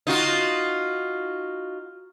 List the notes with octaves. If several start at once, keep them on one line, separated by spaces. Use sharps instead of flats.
D#4 F4 F#4